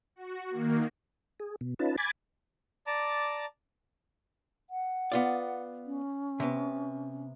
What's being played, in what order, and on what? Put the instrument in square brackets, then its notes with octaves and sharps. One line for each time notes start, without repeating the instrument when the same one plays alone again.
[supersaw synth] F#4
D#3 A#3
[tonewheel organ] G#4
B2
C#4 D#4 F4 B4 A5
G#5 B5 D6 G#6 A6
[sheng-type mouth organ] D5 A5 A#5 D6
[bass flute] F#5
[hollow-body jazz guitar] B3 F4 D5
[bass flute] C#4
[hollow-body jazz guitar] C3 B3